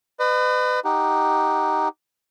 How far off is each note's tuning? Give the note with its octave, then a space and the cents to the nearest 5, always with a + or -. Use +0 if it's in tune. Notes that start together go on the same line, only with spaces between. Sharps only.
B4 +30 D#5 -40
D#4 +0 G4 +0 F#5 +0